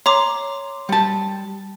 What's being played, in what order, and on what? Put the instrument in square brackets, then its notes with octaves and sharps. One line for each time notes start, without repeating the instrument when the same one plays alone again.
[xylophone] C#5 A#5 D6 [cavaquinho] C6
[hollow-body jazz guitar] G3 A5